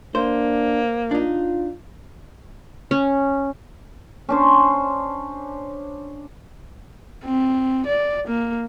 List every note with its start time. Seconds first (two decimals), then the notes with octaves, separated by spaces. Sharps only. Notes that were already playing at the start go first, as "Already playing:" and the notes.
0.15 A#3 D4 C5
1.11 D4 D#4 F4
2.91 C#4
4.29 C#4 D4 C5
7.24 C4
7.86 D5
8.27 A#3